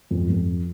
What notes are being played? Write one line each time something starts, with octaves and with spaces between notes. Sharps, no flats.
F2
F2